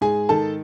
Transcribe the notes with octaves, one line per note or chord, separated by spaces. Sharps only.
G#2 G#4 G#5
D#3 A4 A5